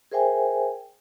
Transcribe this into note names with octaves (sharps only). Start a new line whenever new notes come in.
G#4 A#4 C5 E5 G5 G#5